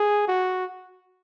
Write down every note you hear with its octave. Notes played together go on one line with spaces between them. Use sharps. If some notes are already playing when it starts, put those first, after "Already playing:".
Already playing: G#4
F#4